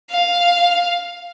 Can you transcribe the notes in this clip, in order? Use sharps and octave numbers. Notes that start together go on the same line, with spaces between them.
F5